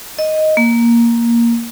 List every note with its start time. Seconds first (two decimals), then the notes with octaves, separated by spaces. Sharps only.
0.19 D#5
0.57 A#3